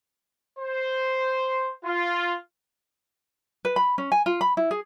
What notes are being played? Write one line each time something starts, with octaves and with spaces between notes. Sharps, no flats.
C5
F4
B4
B5
C#4
G#5
F4
B5
E4
G#4